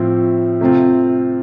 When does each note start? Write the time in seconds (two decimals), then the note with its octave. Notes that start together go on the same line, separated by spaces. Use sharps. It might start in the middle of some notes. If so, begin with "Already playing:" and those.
Already playing: A2 F3 C4
0.61 C3 A3 C4 F4